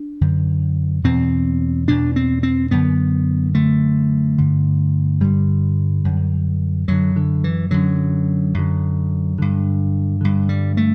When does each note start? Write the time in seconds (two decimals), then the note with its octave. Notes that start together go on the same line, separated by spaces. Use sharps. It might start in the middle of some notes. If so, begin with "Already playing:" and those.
Already playing: D4
0.21 F#2 D3
1.04 E2 B2 C4
1.88 E2 B2 D4
2.16 C4
2.43 C4
2.71 F#2 D3 B3
3.54 F#2 D3 A3
4.38 G2 D3
5.21 G2 D3 G3
6.04 F#2 D3
6.88 F#2 D3 F#3
7.16 D3
7.44 E3
7.71 F#2 D3 F#3
8.54 F#2 D3
9.38 G2 D3
10.21 G2 D3
10.49 G3
10.77 A3